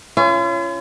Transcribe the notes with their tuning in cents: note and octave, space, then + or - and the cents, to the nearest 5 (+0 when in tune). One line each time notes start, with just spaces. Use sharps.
C#4 +0 F4 -45